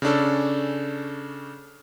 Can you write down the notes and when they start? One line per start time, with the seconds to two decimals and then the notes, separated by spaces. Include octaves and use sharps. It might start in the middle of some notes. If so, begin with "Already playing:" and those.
0.02 C#3 C#4 D4 A4